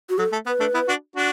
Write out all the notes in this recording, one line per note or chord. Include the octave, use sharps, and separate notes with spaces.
F#4
F#3 A4
A3
B3 B4
A3 D4
B3 E4
D4 F#4
D4 F#4